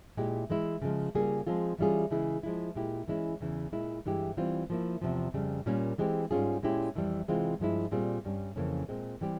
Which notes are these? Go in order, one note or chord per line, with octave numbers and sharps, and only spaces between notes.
A#2 G#3 E4 G4
E3 G#3 E4
C#3 F3 G#3
C#3 G3 A#3 F4 G#4
F3 G#3 C4 F4 G#4
E3 G3 C#4 F4 G#4
C#3 E3 G#3 E4 G#4
F3 G#3 E4
A#2 G#3 E4 G4
E3 G#3 C#4 E4
E2 C#3 E3
A#2 G#3 E4
G2 E3 G#3 E4 G4
E3 G3 C4 F4
F3 A#3 E4
E2 C3 F3
F2 C#3 G3
A#2 G3 A#3 C#4
E3 G#3 C4 G4
G#2 G3 C#4 F4 G#4
A#2 G#3 C#4 E4 G4
F2 E3 G3
C3 E3 G#3 C4 F4
G2 F3 G#3 E4
A#2 G3 C4 F4 G#4
G2 G3 C#4
F2 C#3 E3 A#3 C#4
A#2 G#3 C4
E3 G3 C4 G4